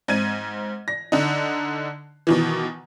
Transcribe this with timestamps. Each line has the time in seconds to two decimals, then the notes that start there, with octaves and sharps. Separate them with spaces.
0.08 G#2 C4 G#6 D#7
0.88 A#6
1.12 D3 D#4
2.27 B2 D#3 E3